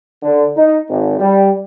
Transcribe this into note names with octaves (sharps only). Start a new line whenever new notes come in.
D3
D#4
G#1
G3